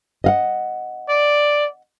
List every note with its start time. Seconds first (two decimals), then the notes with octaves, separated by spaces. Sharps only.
0.24 D#5 F5 F#5
1.09 D5